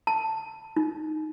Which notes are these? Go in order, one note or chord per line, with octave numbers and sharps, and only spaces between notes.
A5
D#4